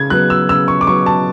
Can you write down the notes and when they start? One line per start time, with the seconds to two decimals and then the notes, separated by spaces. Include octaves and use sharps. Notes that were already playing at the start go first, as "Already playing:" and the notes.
Already playing: C#3 G#6
0.10 F#3 B3 F#6
0.30 E6
0.49 C#3 E6
0.68 C#6
0.81 D6
0.87 F#3 B3 C#6
1.06 A5